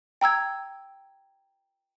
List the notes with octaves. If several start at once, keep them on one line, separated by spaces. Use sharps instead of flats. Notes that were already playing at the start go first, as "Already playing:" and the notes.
G5 A#5 E6 G#6